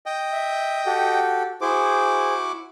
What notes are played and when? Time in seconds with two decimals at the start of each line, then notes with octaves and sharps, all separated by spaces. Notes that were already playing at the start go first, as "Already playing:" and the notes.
0.06 D#5 G5
0.32 E5
0.86 F#4 G4 A4
1.61 E4 F#4 G#4 C5 D6